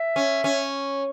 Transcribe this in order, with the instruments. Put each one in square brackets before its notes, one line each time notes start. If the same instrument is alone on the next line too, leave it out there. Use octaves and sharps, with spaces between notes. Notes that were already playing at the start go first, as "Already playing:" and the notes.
Already playing: [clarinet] E5
[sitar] C#4
C#4